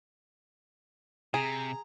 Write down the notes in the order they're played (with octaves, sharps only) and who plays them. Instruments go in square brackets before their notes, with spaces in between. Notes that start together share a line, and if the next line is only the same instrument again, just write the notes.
[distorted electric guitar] C3 [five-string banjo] G#4 [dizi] A#5